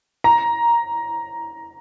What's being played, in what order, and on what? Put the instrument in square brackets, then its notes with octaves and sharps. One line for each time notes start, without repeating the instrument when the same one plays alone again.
[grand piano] A#5